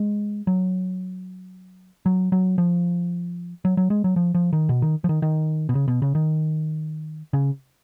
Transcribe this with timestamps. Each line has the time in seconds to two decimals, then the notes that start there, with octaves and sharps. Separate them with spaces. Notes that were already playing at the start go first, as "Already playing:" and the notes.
Already playing: G#3
0.47 F#3
2.06 F#3
2.32 F#3
2.58 F3
3.65 F#3
3.77 F#3
3.90 G#3
4.04 F#3
4.16 F3
4.35 F3
4.53 D#3
4.69 B2
4.82 D#3
5.04 F3
5.09 D#3
5.22 D#3
5.69 B2
5.75 C#3
5.88 B2
6.02 C#3
6.15 D#3
7.33 C#3